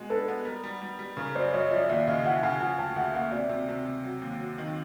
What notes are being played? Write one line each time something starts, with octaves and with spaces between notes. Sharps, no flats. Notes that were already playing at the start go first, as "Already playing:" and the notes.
Already playing: B2 G#3
D4 A4 B4
B3
G3 A#4
G3
G3
G3
C#3 A#4
F#2 C5 D5
F#2 C#5 D#5
F3 D5 E5
D#2 D5 E5
C#3 D#5 F5
E3 E5 F#5
C#3 F#5 G#5
F3 F#5 G#5
D2 G5 A5
D2 E5 F#5
A#3 E5 F#5
C3 D5 E5
C3
C3
C3
F#3
D#2
F#3
D#3